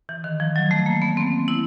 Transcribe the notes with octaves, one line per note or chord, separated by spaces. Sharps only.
E3
D#3
F3
F#3
A3
A#3
B3
C4
E4